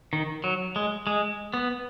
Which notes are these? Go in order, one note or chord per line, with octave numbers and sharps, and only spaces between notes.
D#3
F#3
G#3
G#3
B3